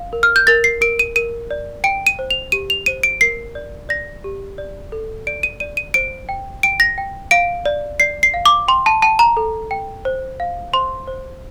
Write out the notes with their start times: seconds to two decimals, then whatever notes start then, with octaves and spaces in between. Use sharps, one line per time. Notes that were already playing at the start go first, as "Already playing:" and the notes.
Already playing: F5
0.13 A#4
0.23 F6
0.36 G6
0.47 A#4 A6
0.64 C7
0.81 A#4 D7
0.99 D#7
1.16 A#4 D#7
1.51 D5
1.84 G5 D7
2.07 D#7
2.19 C5
2.31 F7
2.52 G4 D#7
2.70 F7
2.86 C5 D#7
3.03 D7
3.21 A#4 C7
3.55 D5
3.89 D5 A#6
4.24 G4
4.58 D5
4.92 A4
5.27 D5 D7
5.43 D#7
5.60 D5 D#7
5.77 D#7
5.94 C5 D7
6.29 G5
6.63 G5 D7
6.80 A#6
6.98 G5
7.31 F5 D7
7.66 D5
8.00 D5 C7
8.23 C7
8.34 F5
8.46 D6
8.68 G5 C6
8.86 A5
9.02 G5 A5
9.19 A#5
9.37 A4
9.71 G5
10.05 C5
10.40 F5
10.73 C5 C6
11.08 C5